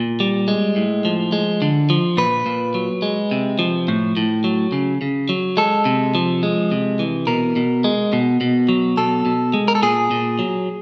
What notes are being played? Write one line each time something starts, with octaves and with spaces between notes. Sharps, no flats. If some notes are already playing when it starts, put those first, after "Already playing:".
Already playing: A#2
G3
G#3
A2
F3
G#3
D3
F3
A#2 B4
A#2
F#3
G#3
C3
F3
A2
A2
F#3
C#3
C#3
F#3
G#3 A4
C3
F3
G#3
C3
E3
B2 A#4
B2
G#3
B2
B2
F#3
B2 A4
B2
G#3
A#4
A4
A#2 G#4
A#2
F#3